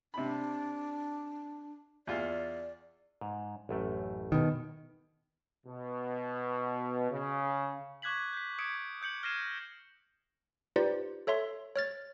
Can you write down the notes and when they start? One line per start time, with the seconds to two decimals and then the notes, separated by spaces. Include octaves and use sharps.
0.14 C3 D4 B5
2.07 E2 F4 D5
3.21 G#2
3.69 A1 F#2 A3
4.32 B2 D#3
5.67 B2
7.11 C#3
8.02 C#6 D6 F#6 G#6 B6 F#7
8.33 G6 B6
8.59 D6 D#6 G#6 B6 C#7 D7
9.02 D#6 G6 C#7 F#7
9.23 F6 G#6 A#6 C7 D#7 E7
10.76 D#4 F4 G4 B4 C5 D5
11.27 A4 C#5 E5 C6
11.76 C#5 F6 A6